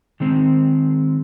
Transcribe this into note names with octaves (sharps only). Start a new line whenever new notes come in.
D#3 G#3 C4